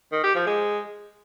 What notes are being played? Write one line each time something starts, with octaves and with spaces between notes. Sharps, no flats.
D#3
G4
F3
G#3